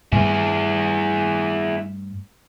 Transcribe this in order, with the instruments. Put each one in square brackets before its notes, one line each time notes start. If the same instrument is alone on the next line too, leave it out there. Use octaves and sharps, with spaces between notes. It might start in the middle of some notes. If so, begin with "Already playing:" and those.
[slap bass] G2 G3 A3 [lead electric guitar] E4 G#4